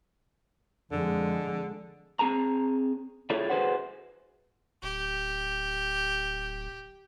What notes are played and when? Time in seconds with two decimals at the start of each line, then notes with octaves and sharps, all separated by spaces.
0.92 F2 D3 G#3
2.19 C4 G#4 A5 A#5
3.30 E4 F4 G#4 A4 C#5 E5
3.50 F#4 G#4 B4 C5 E5 F#5
4.83 D1 G4